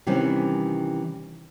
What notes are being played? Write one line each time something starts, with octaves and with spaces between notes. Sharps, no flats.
C3 D#3 E3 G3 C4 C#4